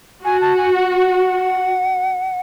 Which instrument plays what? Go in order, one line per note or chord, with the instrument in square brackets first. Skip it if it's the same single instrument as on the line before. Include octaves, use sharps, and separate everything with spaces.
[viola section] F#4 [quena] G#5
[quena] A5
G#5
F#5
F#5